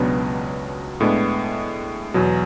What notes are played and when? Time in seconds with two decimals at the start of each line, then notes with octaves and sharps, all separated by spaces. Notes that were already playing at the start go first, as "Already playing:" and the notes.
Already playing: C#2 B2 F#3 B3 D4
1.00 A2 G#3 B3 D4
2.14 E2 B2 F#3